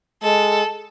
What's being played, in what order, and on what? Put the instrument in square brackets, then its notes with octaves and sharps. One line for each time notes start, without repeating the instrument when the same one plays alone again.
[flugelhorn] G#3 [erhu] A4